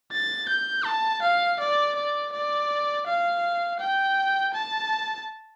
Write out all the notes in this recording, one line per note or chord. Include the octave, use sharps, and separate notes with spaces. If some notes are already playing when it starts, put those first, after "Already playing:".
A6
G6
A5
F5
D5
D5
D5
F5
G5
A5